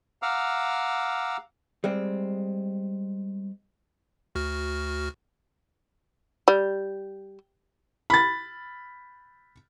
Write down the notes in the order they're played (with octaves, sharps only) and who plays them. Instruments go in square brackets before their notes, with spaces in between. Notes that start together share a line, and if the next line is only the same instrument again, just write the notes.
[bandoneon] F5 F#5 A#5 D6 E6 F6
[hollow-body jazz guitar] G3 G#3 C4
[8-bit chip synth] D2 F#4 F6
[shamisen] G3
[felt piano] B5 A6